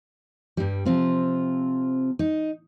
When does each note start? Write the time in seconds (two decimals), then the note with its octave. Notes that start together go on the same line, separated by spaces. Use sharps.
0.57 G2 G3
0.85 C3 F3 C4 F4
2.19 D#4